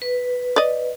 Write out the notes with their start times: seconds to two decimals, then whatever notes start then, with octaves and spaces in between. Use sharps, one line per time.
0.02 B4
0.56 D5 D#5